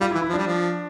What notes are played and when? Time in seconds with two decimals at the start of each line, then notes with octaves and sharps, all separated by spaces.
0.01 G3 F4
0.11 E4
0.15 E3
0.22 E4
0.29 F3
0.33 G3 D4
0.47 F3